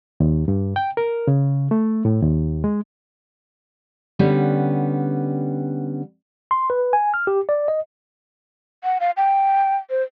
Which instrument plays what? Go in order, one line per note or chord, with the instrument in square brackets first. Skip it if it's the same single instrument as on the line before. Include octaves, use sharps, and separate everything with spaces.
[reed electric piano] D#2
G2
G5
A#4
C#3
A3
A2
D#2
G#3
[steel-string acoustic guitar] D3 G3 B3 C#4
[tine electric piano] C6
B4
G#5
F6
G4
D5
D#5
[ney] F#5
F5
G5
C5